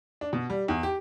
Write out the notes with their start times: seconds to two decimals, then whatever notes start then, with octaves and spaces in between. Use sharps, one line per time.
0.21 D4
0.33 B2
0.50 G3
0.68 E2
0.83 G4